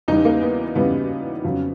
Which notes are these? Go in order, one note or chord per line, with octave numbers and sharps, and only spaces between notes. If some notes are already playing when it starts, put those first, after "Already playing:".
E2 C#3 E3 G3 D#4
A#3
B3
E2 C#3 E3 G3 B3
F2 C#3 F#3